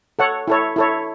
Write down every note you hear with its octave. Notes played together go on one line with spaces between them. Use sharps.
A4 C#5 F#5
E4 A4 C#5
E4 A4 C#5